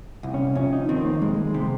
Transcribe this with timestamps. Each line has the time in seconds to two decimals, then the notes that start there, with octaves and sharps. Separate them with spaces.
0.23 C2
0.34 C#4
0.55 F2 C#4
0.73 D#4
0.89 D#3 C4
1.05 A#3
1.22 F2 G#3
1.54 C3